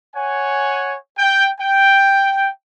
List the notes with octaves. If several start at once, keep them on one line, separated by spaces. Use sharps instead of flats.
C#5 F#5 G#5
G5
G5